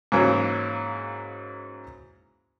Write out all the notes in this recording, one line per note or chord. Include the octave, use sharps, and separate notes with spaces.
G#2 C#3 E3 F#3 A#3